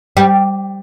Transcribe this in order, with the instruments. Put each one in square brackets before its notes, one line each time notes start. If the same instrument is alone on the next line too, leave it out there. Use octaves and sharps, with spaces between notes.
[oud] G3